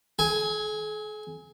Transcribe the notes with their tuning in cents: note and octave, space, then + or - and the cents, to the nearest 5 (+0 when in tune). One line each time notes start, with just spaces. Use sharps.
G#4 +45 G#5 +0